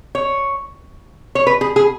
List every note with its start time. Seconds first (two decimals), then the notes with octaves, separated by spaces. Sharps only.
0.15 C#5
1.35 C#5
1.47 B4
1.61 G#4
1.76 G#4